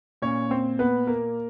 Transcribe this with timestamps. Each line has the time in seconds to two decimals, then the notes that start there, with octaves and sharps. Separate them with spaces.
0.22 A#2 C#4 C#5
0.51 C4 C5
0.79 B3 B4
1.07 A#3 A#4